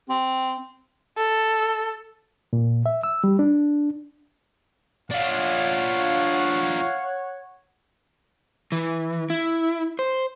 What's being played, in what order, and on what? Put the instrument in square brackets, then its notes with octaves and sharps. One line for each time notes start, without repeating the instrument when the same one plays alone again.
[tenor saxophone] C4
[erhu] A4
[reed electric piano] A#2
E5
E6
G3
D4
[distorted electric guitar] D4 F4 [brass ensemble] C#5 F#5 [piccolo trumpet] F5
[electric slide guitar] E3
E4
C5